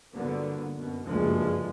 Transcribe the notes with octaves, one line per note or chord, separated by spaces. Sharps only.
G1 D3 F#3 A#3 B3
F#2 B2
F#1 D2 G2 F3 G#3 A#3